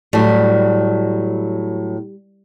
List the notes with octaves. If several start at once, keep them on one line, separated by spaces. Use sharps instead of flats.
A2 F#3 G3